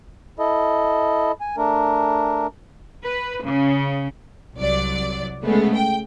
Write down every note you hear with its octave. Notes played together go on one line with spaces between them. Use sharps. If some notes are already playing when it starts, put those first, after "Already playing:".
E4 A4 D#5
G#5
A3 D4 A#4
B4
C#3
C2 F#3 D5
C#3 G#3 A3 B3
G5